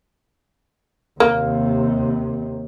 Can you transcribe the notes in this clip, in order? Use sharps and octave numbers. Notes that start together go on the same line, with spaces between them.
D#2 C3 A#3